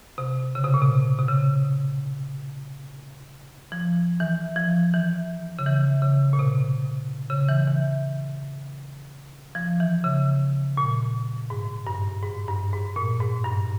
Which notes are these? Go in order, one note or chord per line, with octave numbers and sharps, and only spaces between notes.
C3
C#3
C3
A#2
C3
C3
C#3
F3
E3
F3
E3
C#3
E3
C#3
A#2
C3
C#3
E3
E3
F3
E3
C#3
A#2
G#2
G2
G#2
G2
G#2
A#2
G#2
G2